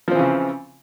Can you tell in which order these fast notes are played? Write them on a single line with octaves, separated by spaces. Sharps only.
F3 C4 E3 C#3